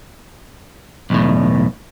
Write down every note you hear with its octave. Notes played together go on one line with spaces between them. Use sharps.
B1 E2 A2